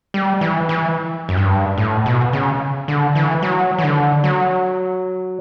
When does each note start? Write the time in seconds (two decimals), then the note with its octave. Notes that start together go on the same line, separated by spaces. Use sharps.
0.14 G3
0.41 E3
0.69 E3
1.29 F#2
1.37 G2
1.78 A2
2.06 B2
2.33 C#3
2.88 D3
3.15 E3
3.43 F#3
3.78 E3
3.84 D3
4.24 F#3